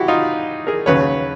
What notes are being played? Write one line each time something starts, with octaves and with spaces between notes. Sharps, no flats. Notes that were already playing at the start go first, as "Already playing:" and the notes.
Already playing: E4 F#4 G4
D#4 F4
G#4 A#4
D#2 C#3 F#3 B4 C#5